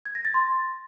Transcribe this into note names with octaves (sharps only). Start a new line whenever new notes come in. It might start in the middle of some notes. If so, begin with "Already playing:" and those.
G#6
A#6
A6
C6